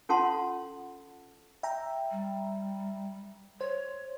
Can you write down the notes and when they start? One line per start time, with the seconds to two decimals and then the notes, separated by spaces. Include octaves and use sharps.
0.09 C#4 F4 A4 F#5 A5 C6
1.63 E5 G5 A#5
2.11 G3
3.61 C5 C#5